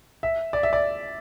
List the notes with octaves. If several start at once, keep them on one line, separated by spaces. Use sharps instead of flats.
E5
D5
E5
D5